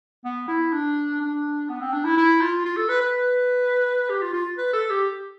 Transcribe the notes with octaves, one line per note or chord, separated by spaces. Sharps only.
B3
E4
D4
D4
B3
C4
D4
E4
E4
F4
F4
A4
B4
B4
G4
F4
F4
B4
A4
G4